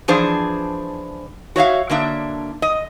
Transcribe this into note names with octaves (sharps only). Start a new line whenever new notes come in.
E3 F3 D4 G#4 C5
F#4 C#5 E5 F5
D3 A#3 D4 E5
D#5